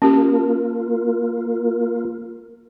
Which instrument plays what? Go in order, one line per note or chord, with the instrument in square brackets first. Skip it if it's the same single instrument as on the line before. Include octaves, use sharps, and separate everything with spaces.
[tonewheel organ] A#3 F4 A#4 [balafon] C#4 G4